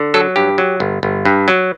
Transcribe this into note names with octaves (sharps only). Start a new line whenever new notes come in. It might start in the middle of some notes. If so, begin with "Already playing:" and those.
Already playing: D3
F#3 A4
G2 G4
F#3
G1
G1
G2
F#3